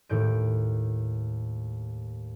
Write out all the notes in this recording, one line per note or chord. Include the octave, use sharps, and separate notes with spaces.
D#2 A2 G6 D7